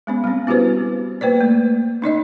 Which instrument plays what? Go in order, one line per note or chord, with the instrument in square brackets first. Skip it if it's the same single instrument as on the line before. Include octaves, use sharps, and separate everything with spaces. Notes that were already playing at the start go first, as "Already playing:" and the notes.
[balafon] G#3 B3 C#4
G3 C4
B3 E4 F#4 G4 B4 C5
A#3 B4 C5 D5
A3
C#4 D#4 D5 D#5